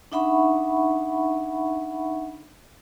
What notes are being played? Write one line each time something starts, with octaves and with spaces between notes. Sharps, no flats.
D4 D#4 E5 F#5 B5 C#6